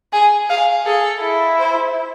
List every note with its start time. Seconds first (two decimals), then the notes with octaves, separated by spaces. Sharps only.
0.13 G#4 G#5
0.50 G#4 F5
0.86 G#4 A4
1.22 E4
1.59 C5